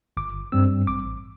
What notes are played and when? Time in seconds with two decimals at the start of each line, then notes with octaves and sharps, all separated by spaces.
0.17 G1 D6
0.52 G2 G3 C4 E6
0.87 A1 D6